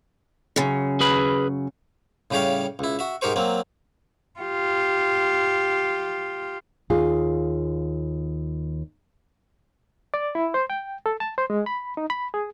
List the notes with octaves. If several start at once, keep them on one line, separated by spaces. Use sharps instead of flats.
F#2 C#3
G#4 B4 B5
A2 C#3 G3 G4 C#5 F5
C#2 E4
F#4 E5
G#2 D#4 G4 A#4 C5 C#6
F#3 A#3 C4
F4 G4
D#2 F4 G#4
D5
E4
C5
G5
A4
A5
C5
G#3
B5
D#4
B5
G#4